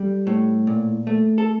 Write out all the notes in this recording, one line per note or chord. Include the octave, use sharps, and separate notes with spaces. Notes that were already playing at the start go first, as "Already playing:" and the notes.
Already playing: G3 A4
A2
A#2
A3
A4